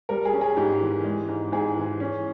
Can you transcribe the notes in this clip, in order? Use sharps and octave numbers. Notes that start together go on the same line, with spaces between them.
G3 A#4
G#4
C#4
G#4
G#2 G4
E3
G#3
G#2
G#2 G#4
E3
C#4